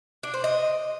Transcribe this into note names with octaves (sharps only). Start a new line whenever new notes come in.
D4
C5
D#5